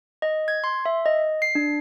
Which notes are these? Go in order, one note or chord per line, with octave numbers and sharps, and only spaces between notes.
D#5
G#6
C6
E5
D#5
C7
D4